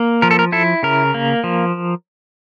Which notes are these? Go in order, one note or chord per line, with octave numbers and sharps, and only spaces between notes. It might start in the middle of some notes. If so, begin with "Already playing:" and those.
Already playing: A#3
F3 A#4
A4
A#4
E4 A4
C#3 A#4
A#3
F3